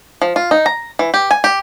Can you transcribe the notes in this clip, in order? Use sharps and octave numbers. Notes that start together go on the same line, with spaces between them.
F3
F4
D#4
A#5
E3
G4
G#5
G4